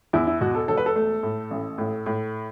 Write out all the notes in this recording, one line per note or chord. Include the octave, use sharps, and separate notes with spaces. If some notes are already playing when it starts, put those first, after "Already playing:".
E2 E4
E4
B2 F#4
A4
E1 A4
B4
A4
A3
A2
A1
A2
A2